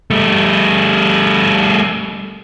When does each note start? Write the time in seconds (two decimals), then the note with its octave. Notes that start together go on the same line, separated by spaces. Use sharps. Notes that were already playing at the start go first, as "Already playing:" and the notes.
0.11 G3 A3